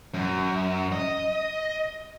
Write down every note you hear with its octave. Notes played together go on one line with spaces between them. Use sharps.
F#2
D#5